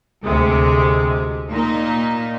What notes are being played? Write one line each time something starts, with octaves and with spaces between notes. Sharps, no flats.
D2 C3 G#3
A#2 D#4